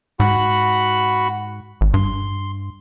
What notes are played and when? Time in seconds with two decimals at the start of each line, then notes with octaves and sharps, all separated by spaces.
0.20 G#2 F#4 F#5 B5
1.81 G#1
1.94 G2 C6